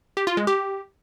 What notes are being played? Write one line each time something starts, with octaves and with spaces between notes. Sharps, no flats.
G4
F4
G#3
G4